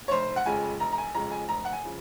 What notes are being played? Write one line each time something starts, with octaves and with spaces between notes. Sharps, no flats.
C#5
F1 C5
F#5
F2 C#3 F3 G#3 G#5
F1 A#5
A#5
G#5
F2 C#3 F3 G#3 A#5
G#5
F1 A#5
F#5
G#5
C#3 F3